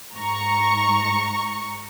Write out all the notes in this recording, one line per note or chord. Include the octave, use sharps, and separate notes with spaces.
G#2 A#5 C#6